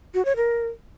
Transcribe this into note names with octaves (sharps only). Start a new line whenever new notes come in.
F#4
C#5
A#4